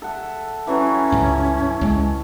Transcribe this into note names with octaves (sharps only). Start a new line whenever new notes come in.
A4 E5 F#5
E3 F#3 C#4 C#5
C#2 G2
C#2 G3 G#3